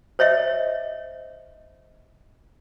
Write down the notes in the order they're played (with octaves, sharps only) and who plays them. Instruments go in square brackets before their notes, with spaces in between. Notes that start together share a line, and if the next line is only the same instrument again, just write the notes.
[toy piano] C5 C#5 D#5 E5